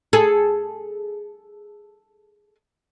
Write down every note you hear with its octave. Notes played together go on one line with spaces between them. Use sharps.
G#4 A4